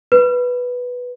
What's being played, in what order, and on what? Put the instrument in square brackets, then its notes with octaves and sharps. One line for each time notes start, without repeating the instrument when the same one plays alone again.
[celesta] B4